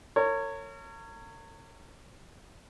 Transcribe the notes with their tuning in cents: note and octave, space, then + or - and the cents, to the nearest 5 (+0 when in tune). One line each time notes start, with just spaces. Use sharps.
A#4 -40 C#5 +0